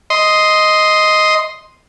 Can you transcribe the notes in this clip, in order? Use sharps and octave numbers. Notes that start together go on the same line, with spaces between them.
D#5 C6